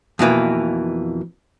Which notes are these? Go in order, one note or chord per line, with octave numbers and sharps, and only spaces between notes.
F2 B2 E3 A#3